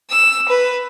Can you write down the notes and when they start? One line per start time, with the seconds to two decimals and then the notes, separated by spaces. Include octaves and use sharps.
0.10 E6
0.48 B4